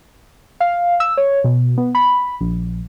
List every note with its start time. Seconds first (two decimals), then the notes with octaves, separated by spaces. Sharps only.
0.60 F5
1.00 E6
1.17 C#5
1.44 B2
1.77 B3
1.95 B5
2.41 A#1